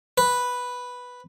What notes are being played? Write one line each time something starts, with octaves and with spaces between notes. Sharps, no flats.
B4